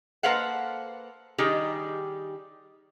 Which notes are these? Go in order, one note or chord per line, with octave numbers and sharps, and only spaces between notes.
A#3 A4 B4 C5 F5 F#5
D#3 G3 D#4 G4 G#4